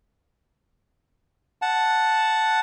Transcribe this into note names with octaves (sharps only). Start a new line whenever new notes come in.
F#5 A5